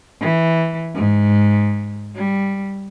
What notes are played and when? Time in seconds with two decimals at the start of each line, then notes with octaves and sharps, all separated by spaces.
0.21 E3
0.95 G#2
2.16 G3